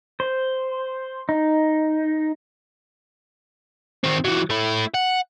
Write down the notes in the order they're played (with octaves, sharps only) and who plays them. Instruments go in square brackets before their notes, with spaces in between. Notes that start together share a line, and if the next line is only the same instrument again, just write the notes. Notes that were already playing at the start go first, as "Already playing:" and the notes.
[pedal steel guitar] C5
D#4
[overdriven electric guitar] D#3 C4
E3 F#3
A3 E4
F#5